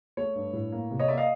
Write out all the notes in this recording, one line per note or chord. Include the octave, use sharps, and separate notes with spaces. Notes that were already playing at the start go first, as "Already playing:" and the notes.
A3 C#5
G2
A2
A#3
C3
C#5 D#5
A#3 D5 E5
D#5 F5